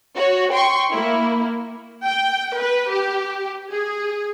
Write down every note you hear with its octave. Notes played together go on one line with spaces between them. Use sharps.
F#4 C#5
G5 C6 C#6
A#3 E4
G5
B4
G4
G#4